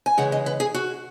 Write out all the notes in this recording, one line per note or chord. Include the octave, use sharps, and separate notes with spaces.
G#5
C#3 E3 G#3 F#5
D#5
B4
G#4
F#4